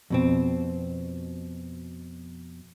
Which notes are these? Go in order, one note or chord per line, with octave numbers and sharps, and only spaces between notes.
F2 B2 C4